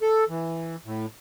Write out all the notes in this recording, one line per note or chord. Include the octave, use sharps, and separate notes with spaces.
A4
E3
A2